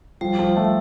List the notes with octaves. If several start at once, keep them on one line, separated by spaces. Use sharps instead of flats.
F3 G3
F3
A3